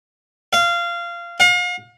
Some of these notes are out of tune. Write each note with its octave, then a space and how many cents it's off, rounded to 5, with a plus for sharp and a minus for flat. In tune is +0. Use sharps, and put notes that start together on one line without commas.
F5 -20
F5 +40